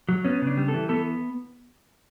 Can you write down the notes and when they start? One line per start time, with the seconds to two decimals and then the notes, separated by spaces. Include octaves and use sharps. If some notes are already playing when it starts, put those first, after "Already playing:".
0.09 F#3
0.25 B3 C#4
0.42 C#3
0.47 D4
0.57 G3
0.68 A4
0.74 E3
0.89 B3 A4